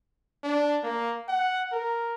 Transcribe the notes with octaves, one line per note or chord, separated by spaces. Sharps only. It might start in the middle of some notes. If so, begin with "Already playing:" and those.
D4
A#3
F#5
A#4